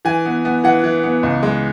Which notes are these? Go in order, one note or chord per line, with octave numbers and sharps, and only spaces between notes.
E3 G#5
B3
B3
E3 F#5
E3
B3
C#2
G#3